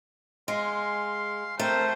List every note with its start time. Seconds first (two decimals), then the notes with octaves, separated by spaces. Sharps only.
0.48 G#3 F5 C6
1.60 A3 C4 A#4 C5